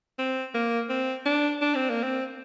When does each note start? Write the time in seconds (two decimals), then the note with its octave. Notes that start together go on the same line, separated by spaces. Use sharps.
0.19 C4
0.55 A#3
0.89 C4
1.26 D4
1.61 D4
1.75 C4
1.90 A#3
2.03 C4